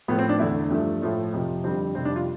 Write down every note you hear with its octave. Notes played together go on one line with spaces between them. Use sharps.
A2 F3 A3 B3
C4
D4
E2 D3 A3 E4
G2 F3 A3
A2 F3 A3
F2 C3 F3
F2 D3 G3 C4
F2 C3 G3 C4
D4
F4